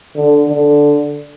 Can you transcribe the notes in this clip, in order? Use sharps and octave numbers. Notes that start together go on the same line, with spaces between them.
D3
D3